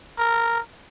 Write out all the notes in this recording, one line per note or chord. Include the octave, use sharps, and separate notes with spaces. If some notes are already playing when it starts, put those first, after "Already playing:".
A#4